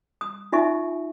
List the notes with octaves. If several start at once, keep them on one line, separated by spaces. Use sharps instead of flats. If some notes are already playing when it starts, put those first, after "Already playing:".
D#6
D#4 F4 E5 G#5 C#6